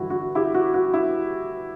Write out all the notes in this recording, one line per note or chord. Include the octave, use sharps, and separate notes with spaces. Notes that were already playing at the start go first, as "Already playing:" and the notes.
Already playing: G1 E3 G3 E4 F#4
F#4
E4 G4
F#4
F#4
E4